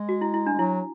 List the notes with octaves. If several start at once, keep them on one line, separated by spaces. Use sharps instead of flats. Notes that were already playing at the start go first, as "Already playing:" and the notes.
Already playing: G#3
F#4
E4
E4
D4
G#3
F#3 E4